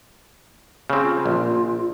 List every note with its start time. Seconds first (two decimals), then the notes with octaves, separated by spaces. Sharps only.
0.90 C#3 C4
1.03 F4
1.26 A#1